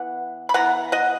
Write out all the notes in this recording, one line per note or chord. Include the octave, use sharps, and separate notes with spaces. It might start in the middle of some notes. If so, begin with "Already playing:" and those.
Already playing: E3 B3 F#5
B5
E3 B3 F#5 A#5
D#5 F#5